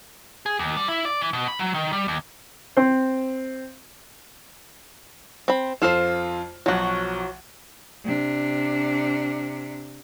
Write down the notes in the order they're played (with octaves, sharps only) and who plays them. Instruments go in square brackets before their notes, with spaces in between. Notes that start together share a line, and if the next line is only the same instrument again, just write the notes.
[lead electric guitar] G#4
D#2
G3
E4
D5
E3
B2
B5
F#3
D#3
G3
D#2
[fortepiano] C4 C5
[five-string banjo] C4 B5
[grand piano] F2 F4 [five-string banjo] A4 C5
[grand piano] B1 F3 [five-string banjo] F#3 F#4
[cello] C3 D4